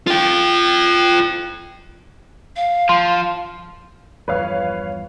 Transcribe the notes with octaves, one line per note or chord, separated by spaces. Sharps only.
F4 G5
F5
F3 C6
E2 G2 F3 B4 C#5 F5